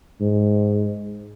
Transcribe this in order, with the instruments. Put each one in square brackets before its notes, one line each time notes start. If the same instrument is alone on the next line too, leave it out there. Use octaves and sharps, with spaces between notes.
[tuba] G#2